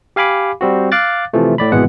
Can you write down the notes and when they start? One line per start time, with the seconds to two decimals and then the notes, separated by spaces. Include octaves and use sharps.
0.16 G4 F5 G#5 B5 D6
0.61 G3 C4 F#4
0.92 F5 D6 F#6 A6
1.33 C3 E3 F3 A3
1.58 A2 D5 B5
1.72 G#1 B2 E3 G#3 B3 F#5